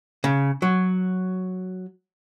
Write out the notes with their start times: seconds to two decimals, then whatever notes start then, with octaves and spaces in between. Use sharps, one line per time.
0.24 C#3
0.62 F#3